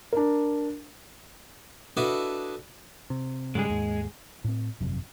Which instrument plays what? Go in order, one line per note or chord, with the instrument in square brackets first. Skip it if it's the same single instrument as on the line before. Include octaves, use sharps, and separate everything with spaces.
[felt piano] D4 A#4
[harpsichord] D4 E4 F#4 A4 B4 D#5
[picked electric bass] C3
[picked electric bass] G#2 C#3 G3 [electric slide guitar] G#3 G#4
[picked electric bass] D#2 G#2
[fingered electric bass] A2 C4
G1 F2 C3 F#3